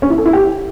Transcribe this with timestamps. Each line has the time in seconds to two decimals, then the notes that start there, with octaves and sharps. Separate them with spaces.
0.02 C#4
0.10 E4
0.18 A4
0.26 E4
0.33 G4